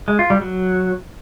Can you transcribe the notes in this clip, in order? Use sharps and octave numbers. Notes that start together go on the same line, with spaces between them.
G#3
F4
G3
F#3